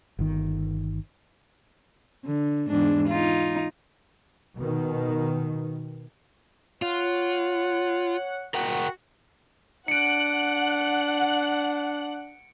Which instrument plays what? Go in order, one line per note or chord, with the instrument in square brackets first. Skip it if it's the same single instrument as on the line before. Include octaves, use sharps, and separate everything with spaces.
[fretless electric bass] G1 D#3
[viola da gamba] D3
E2 G#2 D4
D#4 F4
[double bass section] B2 D#3
[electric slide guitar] F4 [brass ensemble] C#5 F#5
[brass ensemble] F#4 [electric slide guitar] A#4 F#5 G5
[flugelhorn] D4 [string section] F#5 F#6 [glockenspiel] C#7 D7